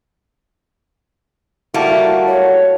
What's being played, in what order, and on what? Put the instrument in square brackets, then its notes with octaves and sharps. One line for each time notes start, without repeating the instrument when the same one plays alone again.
[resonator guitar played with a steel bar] G3 A3 A#3 [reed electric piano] E4 A5 [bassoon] F#4
[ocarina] C#5